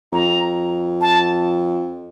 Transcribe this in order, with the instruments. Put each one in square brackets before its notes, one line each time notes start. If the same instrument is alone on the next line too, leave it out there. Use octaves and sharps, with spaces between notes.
[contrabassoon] F2 [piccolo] A#5
[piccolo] A5